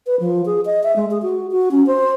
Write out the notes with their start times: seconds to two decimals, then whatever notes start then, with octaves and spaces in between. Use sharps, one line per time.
0.07 B4
0.20 F3
0.46 G#4
0.66 D#5
0.84 E5
0.96 G#3
1.11 G#4
1.22 F#4
1.51 F#4
1.71 C#4
1.87 C5